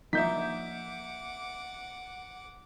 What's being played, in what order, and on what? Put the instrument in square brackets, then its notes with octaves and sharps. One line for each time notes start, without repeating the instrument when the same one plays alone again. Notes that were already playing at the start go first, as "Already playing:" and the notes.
[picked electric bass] F3 A#3 [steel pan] D#4 [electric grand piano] E5 G6 B6 [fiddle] F#5 D6